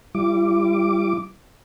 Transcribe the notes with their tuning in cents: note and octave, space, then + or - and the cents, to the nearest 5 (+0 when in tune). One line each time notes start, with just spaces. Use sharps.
G3 +0 E4 +45 D6 +0